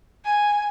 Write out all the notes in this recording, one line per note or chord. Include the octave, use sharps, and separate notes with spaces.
G#5